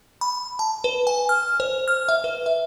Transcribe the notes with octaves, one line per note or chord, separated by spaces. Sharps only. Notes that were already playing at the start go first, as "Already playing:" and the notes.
B5
A5
B4
G#5
F6
C5
F6
E5
B4
E5